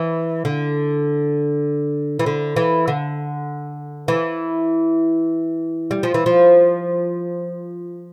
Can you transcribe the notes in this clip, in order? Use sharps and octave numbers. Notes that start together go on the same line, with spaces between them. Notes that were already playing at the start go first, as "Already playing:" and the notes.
Already playing: E3
D3
E3
D3
E3
D3
E3
G3
F3
E3
F3